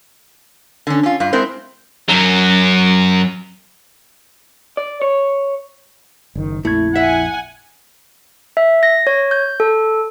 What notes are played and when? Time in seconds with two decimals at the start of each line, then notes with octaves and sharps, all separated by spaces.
0.87 D3 C#4
1.03 C#4 F4
1.20 G2 F4
1.33 G#3 C4 E4 A#4 C5
2.09 F#2 F#3
4.77 D5
5.02 C#5
6.35 F#1 D#3
6.65 A#1 F2 A3 E4 G#6
6.95 E5 F#5 G#5
8.57 E5
8.83 A#6
9.07 C#5
9.31 G6
9.60 A4